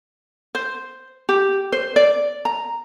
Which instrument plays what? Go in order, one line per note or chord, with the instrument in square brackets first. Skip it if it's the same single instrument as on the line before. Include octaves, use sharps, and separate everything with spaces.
[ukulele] C5
G4
C5
D5
A#5